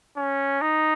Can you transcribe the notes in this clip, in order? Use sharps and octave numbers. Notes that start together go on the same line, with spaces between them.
C#4
D#4